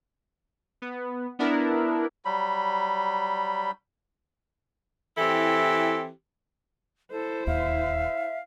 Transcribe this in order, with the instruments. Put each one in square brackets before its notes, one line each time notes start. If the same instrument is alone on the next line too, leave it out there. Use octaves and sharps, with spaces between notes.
[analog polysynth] B3
B3 D4 E4 A#4
[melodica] F#3 G3 B5
[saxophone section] E3 C4 E4 G4 A4
[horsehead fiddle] E4 C5 [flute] A4
[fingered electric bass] D1 D#2 [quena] E5 [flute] F5